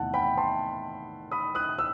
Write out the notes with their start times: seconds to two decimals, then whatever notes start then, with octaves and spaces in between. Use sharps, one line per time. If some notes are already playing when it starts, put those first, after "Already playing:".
Already playing: E2 C3 D#3 A3 F#5 A5
0.14 G5 B5
0.37 A5 C6
1.31 B5 D#6
1.55 D#6 F#6
1.79 E6